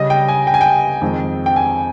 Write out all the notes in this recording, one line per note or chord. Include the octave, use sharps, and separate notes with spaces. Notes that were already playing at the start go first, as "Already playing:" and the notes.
Already playing: C#3 G3 C#4 D#5
G5
G#5
G5
G#5
G5
F2 D#3 G#3 C4
G5
G#5